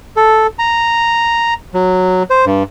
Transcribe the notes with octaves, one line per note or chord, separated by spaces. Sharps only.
A4
A#5
F#3
C5
G2